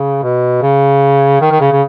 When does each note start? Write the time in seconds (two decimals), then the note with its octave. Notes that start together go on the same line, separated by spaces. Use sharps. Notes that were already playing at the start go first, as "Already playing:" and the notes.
Already playing: C#3
0.23 B2
0.62 C#3
1.41 D#3
1.51 D#3
1.61 C#3
1.72 C#3